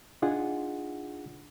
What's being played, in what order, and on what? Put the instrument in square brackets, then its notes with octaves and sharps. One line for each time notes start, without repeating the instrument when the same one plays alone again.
[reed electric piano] D4 D#4 F4 G#4 F#5